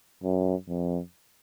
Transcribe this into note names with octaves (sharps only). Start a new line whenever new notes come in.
F#2
F2